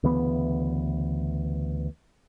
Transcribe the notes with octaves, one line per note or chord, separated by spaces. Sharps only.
D2 C#3 E3 B3